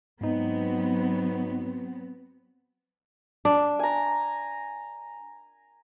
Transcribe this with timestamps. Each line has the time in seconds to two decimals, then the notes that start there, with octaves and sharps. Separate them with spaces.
0.21 G#2 F#3 B3 C4 D#4
3.45 D4
3.79 G#5 A#5